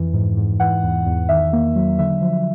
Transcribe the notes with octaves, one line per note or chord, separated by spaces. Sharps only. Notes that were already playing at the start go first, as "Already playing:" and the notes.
Already playing: F2 E3
G#2
G#2
E3 F#5
E2
E2
D#3 E5
A#3
F#3
D3 E5
F3